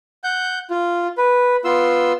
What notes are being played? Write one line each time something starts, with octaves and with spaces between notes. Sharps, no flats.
F#5 G6
F4
B4
B3 F4 C6 E6